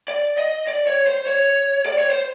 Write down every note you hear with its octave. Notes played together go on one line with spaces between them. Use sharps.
D5
D#5
D5
C#5
C5
C#5
D5
C#5
C5